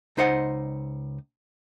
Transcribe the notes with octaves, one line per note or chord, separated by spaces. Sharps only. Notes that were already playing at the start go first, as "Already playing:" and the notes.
C#2 D#4 C5 D#5 F#5